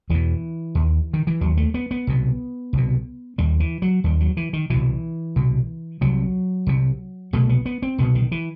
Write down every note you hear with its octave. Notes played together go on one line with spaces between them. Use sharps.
E2 B2 E3
D#2
D#3
E3
D#2 F#3
A3
B3
B3
C2 B2
C2 B2
D#2 G3
E3
F#3
D#2 G3
F#3
E3
D#3
C2 B2 E3
C2 B2
C2 C3 F#3
C2 C3
C2 B2 A3
B3
B3
C4
C2 B2 B3
D#3
E3